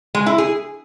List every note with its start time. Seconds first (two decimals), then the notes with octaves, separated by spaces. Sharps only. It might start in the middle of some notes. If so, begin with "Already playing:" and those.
0.15 G#3
0.26 E4
0.38 G#4